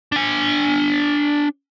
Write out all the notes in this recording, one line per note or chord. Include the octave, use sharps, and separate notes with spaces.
D4 G#5